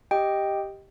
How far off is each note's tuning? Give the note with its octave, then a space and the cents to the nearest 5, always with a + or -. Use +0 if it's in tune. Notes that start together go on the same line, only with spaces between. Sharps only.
G4 +0 D#5 +0 G5 +0